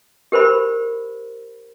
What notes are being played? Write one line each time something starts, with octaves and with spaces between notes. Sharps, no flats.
G4 A#4 C5 B5